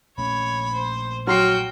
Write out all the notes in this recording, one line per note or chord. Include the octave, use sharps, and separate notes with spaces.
A#1 A3 C#4 C#5 B5
C5
F#3 F#4 G5 C6 F6 C7